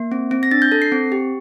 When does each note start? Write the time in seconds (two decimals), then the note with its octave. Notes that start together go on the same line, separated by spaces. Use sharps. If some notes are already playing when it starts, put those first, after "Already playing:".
Already playing: A#3
0.12 C4
0.31 C4
0.43 A#6
0.51 D4 A6
0.62 G6
0.72 A4 A#6
0.82 C7
0.92 C4
1.12 G4